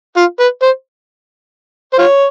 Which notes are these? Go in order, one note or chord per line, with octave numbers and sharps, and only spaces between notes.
F4
B4
C5
C5
F4 C#5